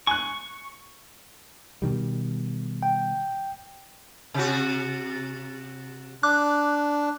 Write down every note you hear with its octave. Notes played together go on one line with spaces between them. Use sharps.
G#5 C#6 F#6
B2 D#3 G3
G5
C3 F#4
D4 D6 F#6